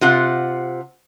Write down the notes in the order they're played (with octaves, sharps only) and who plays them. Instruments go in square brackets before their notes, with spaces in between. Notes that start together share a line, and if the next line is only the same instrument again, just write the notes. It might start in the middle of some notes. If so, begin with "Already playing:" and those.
[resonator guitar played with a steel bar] C3 F4 F#5